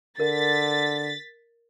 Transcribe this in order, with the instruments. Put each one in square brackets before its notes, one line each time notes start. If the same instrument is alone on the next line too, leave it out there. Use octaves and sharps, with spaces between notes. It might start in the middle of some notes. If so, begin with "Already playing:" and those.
[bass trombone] D3 [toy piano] A#4 [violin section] A6 B6